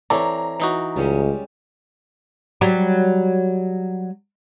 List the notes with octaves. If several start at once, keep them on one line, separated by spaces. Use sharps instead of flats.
E3 C4 A4 C#5 D5 A#5
E3 D#4 F#4
C#2 G3 G#3 C#4
F#3 G3